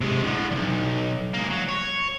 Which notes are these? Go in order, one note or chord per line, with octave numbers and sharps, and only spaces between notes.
C3 G#3
A2 D3
B1 G2
G#3 A#3
F#3
C#5